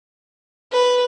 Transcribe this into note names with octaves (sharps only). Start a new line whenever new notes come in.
B4